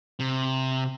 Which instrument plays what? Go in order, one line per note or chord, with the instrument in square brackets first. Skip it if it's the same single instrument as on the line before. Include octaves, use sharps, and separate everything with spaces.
[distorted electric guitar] C3